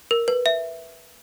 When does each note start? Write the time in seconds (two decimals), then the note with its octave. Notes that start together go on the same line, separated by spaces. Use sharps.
0.11 A#4
0.28 B4
0.46 E5